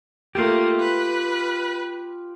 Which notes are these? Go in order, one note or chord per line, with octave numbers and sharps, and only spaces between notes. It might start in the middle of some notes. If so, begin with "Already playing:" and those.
A3 A#3 F4 G4
B4